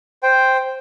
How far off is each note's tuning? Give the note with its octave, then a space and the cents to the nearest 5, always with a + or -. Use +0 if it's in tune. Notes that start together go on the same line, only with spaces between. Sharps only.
C5 +0 G5 +0